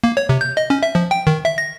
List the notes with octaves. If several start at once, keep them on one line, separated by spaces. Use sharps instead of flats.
A#3
C#5
C3
G6
D#5
C#4
E5
F3
G5
D#3
E5
A#6